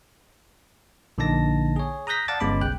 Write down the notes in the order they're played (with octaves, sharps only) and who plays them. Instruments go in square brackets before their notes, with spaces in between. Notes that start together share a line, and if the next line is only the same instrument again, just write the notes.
[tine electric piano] A#1 D3 A#3 D#4 A5 A#6
G#4 C#5
A#5 D#6 F#6 G6 A#6 B6
D5 F5 F#5 A5 D6 A6
G1 G#3 B3 C#4 B5 D6
C2 G5 F#6